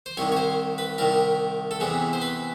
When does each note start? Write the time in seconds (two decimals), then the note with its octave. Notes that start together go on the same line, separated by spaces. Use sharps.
0.06 C5
0.17 C2 C3 D#3 C#5
0.32 C#5
0.37 C5
0.78 B4
0.98 C2 C3 D#3 A#4
1.71 A4
1.80 E2 C3 E3 G#4
2.13 C5
2.22 B4